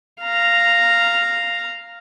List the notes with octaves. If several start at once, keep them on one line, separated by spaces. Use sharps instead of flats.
F5 A#5